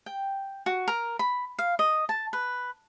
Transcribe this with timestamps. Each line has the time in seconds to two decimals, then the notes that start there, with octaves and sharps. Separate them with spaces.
0.06 G5
0.66 F#4
0.88 A#4
1.19 B5
1.59 F5
1.79 D#5
2.09 A5
2.33 B4